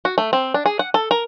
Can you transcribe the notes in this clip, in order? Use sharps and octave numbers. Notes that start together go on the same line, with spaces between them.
F#4
A3
C4
D4
G#4
F#5
A4
A#4